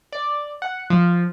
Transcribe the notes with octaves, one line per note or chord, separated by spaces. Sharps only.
D5
F#5
F3